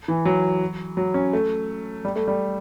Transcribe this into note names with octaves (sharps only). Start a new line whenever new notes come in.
E3
F#3
F#3
C#4
A3
G3
A3
G3